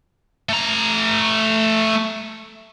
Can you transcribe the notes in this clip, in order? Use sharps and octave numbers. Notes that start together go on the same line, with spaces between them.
A3 A#5